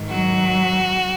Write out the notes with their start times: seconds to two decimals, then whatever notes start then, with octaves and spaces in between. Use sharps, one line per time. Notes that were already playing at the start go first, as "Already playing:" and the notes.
Already playing: G#2 D#3
0.08 F#3 F#4